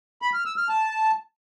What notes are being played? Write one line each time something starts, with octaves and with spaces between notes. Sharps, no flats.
B5
F6
E6
F6
A5